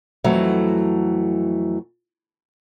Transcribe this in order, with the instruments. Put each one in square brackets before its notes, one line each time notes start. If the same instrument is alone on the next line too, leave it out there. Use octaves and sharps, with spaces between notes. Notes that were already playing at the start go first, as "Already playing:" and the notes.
[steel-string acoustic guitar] F2 E3 F#3 A3